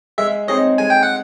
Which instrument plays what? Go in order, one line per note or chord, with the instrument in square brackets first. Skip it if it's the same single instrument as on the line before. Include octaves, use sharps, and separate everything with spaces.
[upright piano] G#3 [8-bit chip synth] E5
[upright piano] C4 D#4 G#4 C#5 [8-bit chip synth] D#5
[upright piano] G#3 [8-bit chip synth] G#5
[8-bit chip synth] G5
F#5